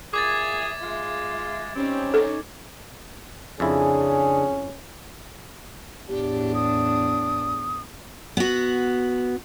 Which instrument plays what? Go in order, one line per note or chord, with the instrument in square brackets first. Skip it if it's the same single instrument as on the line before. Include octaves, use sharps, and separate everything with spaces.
[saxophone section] A#2 G#4 [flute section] E5 [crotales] D6 G#6 A6
[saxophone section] G#3 F4
[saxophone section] G3 C4 [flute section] C#4 D#4 C#5
[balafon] A4
[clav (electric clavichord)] F2 F3 E4 [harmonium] C#3 D4 [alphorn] C#4 [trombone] G#4
[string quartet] E2 A2 D4 [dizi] G4
[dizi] D#6
[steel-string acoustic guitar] B3 F#4